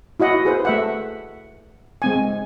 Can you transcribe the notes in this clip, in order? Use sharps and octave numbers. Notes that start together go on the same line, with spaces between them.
E4 F#4 D#5 F#5
G#4 B4 C5
A3 E5 F#5
G#3 C4 G#5